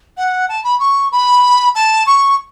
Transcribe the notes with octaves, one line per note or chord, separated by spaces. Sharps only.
F#5
A5
B5
C#6
B5
A5
C#6